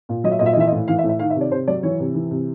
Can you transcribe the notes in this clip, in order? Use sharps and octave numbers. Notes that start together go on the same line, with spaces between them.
A#2
F#3 D#5
E5
A#2 D#5
E5
D#5
E3 E5
D#5
A2
E3 F5
E5
A2
E5
D#3 F5
E5
C3
D5
C3 C5
F#3 D5
E3 C#5
C3
E3
C3